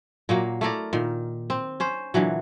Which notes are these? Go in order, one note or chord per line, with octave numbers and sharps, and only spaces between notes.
A#2 F#3 A#3
A3 E4 A#4 D5
A#2 D#3
C4
C#4 C5
A#2 D3 E3 F#3